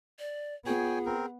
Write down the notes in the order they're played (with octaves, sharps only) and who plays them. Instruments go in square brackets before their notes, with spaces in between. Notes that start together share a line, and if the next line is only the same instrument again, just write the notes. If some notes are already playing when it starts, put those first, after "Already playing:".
[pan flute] D5
[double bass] B3 [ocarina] F4 [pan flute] G#4 [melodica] C#5 G5 G#5
[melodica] C4 A#4